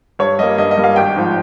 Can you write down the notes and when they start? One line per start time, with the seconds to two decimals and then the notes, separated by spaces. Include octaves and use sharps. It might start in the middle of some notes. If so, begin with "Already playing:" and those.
0.19 G2 C#5
0.39 G3 A#3 D#5
0.58 G2 D#5
0.71 D#5
0.77 G3 A#3
0.84 F5
0.96 G#1 G5
1.16 G#2 F3